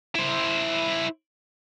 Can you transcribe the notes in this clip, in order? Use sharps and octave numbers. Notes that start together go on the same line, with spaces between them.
E4 C5